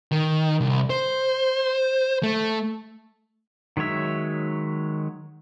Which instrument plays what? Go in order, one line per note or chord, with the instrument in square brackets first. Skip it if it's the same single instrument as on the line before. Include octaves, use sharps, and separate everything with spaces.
[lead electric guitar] D#3
C2
C5
A3
[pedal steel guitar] D#3 F#3 G#3 C#5 E5